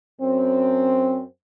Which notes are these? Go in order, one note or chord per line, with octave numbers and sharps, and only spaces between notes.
F#2 C4